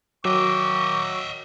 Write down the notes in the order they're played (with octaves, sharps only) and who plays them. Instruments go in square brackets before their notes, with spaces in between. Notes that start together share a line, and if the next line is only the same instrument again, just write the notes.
[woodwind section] D#3 G5 D6 [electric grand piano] F#3 [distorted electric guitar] D#5 E5 [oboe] C#6